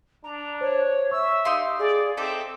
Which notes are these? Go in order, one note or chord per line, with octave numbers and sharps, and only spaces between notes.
D4 A#5
C5 C#5
E5 C#6 E6
D#4 G4 F5 C6
G#4 D5
C4 D#4 A4 E5 D6